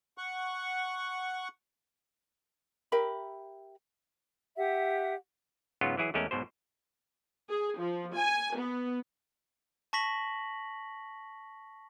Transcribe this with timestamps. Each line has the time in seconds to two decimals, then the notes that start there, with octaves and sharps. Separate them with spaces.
0.18 F#5 C#6
2.92 G4 A#4 E5 B5
4.57 G4 E5 F#5
5.81 G#2 C#3 F#3 B3 F4
5.97 E3 F#3 E4 G#4
6.14 E2 G#3 A3 C#4 A#4
6.31 B1 G#2 B2 C5
7.50 G#4
7.81 F3
8.16 G#5
8.58 B3
9.93 A5 C#6 A#6 B6 F#7